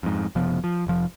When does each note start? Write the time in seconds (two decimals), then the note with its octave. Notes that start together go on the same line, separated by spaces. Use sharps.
0.03 F2 G#2
0.35 F#1 C3 F3 B3
0.64 F3
0.87 F1 F3